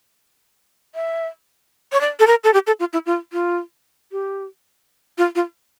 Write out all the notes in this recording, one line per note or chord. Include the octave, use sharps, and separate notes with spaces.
E5
C#5
D5
A4
A#4
A4
G4
A4
F4
E4
F4
F4
G4
F4
F4